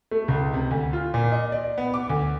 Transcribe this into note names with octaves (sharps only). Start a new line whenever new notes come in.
A3
C#2
C3
D2
F4
A#2
D#5
D5
B3
D6
D2